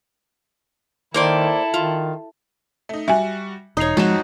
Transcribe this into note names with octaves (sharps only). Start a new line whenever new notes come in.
D#3 A#3 E4 A4 C5 D5
D#3 F4
A3 D#4
G3 F#4 E5 G#5
E1 D#4 C#5 D#6 C7 F7
F2 G#2 F3 G#3 D#4 F#4 E7